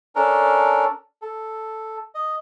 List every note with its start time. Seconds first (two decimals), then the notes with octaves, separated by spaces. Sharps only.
0.16 C#4 D4 A4 A#4
1.22 A4
2.15 D#5